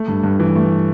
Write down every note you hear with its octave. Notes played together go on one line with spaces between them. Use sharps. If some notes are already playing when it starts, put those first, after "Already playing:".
Already playing: A3
G2
G2
E3
A3